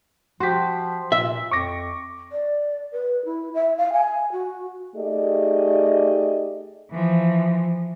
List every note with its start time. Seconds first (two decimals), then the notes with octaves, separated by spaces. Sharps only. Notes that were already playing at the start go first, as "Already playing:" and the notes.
0.40 F3 F#4 G4 C6 B6
1.12 A#2 E5
1.51 F2 C#6 D6 A#6
2.32 D5
2.92 B4
3.25 E4
3.54 E5
3.77 F5
3.93 G#5
4.32 F#4
4.95 A3 D#4 G4 G#4 D5 D#5
6.91 E3 F3